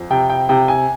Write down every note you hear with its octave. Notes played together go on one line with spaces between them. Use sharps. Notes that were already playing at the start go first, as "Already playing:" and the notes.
Already playing: F2
C3 G5
G5
C3 G5
G#5